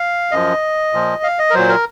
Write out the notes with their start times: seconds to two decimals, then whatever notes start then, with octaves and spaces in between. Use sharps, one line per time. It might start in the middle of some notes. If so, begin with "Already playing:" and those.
Already playing: F5
0.31 F#2 F3 D#5
0.93 A#2 F3
1.23 F5
1.39 D#5
1.50 A#4
1.54 A#2 F#3 C5
1.69 A#4